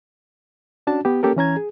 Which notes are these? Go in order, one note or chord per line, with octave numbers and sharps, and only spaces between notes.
C#4 D4 F#4 A5
B3 G4
A#3 C#4 G4 A4 A#4
E3 C#4 A#5 G#6
G#4